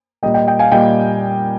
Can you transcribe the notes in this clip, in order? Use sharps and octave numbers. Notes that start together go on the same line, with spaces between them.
A#2 G3 A#3 D#5 G5
D#5 G5
D#5 G5
F5 G#5
A#2 G3 A#3 D#5 G5